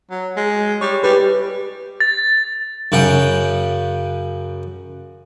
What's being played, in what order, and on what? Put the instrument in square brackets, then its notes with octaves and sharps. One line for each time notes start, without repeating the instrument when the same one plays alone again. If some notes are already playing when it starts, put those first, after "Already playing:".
[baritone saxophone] F#3
G#3
[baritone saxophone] G3 [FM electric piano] C#5
[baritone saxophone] G3 [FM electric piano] G4 B4
[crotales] A6
[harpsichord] F#2 C#3 F#5 G5